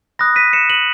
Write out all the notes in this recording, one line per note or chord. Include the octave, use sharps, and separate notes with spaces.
B5 D#6 F#6 A#6
B6 D#7
C#7 E7
D#7 F#7